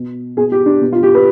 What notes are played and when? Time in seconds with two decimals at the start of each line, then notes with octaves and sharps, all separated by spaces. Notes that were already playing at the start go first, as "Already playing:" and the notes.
Already playing: B2
0.37 B2 G#4
0.52 G4
0.66 D4
0.81 B2
0.92 F4
1.03 G4
1.15 B4